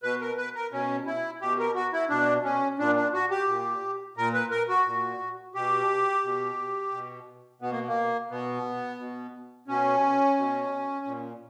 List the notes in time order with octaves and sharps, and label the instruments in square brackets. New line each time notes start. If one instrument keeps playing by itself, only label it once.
[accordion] B2 B4
A#4
B4
A#4
B2 C#4
E4
B2 G4
A#4
F#4
E4
B2 D4
C#4
A#2 D4
D4
F#4
G4
A#2
A#2 A#4
B4
A#4
F#4
A#2
B2 G4
B2
B2
B2 B3
A#3
A#3
B2 B3
B2
B2 C#4
B2
A#2